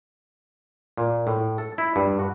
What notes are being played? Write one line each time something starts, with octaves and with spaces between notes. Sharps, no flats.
A#2
A2
A4
E4
G2
F#4